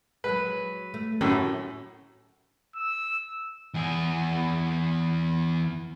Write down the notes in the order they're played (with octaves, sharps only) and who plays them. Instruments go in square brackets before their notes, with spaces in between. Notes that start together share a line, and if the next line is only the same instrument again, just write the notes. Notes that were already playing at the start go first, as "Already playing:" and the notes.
[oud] F#3 G#3 [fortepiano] B4
[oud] A3
[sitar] F#2 [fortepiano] A2 [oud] G4
[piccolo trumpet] E6
[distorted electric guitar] E2 G#4